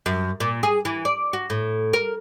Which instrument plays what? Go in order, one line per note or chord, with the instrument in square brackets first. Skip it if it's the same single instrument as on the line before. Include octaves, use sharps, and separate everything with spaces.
[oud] F#2
A#2
G#4
E3
D5
F#4
A2
A#4